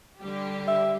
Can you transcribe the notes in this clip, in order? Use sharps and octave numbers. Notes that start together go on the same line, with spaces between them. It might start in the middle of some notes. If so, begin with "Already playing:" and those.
D3 G3 G4
E5